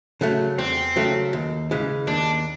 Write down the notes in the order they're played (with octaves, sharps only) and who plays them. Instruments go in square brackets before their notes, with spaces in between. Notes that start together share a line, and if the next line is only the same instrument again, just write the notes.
[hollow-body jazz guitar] C#3 F#3 A3
[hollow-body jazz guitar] E2 [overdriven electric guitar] C4
[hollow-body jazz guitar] C#3 F#3 A3
D#2
C#3 E3 G#3
[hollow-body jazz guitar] D#2 [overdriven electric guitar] D4